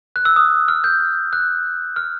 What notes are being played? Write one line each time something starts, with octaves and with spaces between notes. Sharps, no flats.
F#6
E6
D#6
F6
G6
F#6
F6